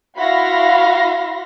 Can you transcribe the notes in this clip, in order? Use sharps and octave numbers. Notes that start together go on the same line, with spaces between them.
E4 F#4 F5 B5 C6 A#6